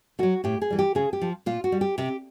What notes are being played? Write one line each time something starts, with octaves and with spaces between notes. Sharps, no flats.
D#3 F#3 F#4
A2 G4
G#4
E3 G3
G4
C#3 G#4
G4
F3
A#2 F4
F#4
G3
G4
C3 G4